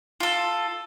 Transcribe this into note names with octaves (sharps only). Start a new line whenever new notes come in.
F4 A4